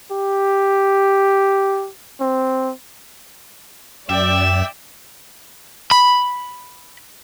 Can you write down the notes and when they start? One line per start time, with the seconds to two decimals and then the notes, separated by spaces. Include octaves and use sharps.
0.11 G4
2.21 C4
4.09 F#2 D5 E5 G5
5.91 B5